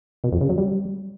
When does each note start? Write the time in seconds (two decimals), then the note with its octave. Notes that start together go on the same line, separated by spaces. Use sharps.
0.24 B2
0.32 F2
0.41 C#3
0.49 F#3
0.58 G3